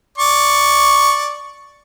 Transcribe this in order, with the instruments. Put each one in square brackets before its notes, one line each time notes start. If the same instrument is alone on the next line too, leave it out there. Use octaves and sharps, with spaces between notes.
[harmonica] D5 C#6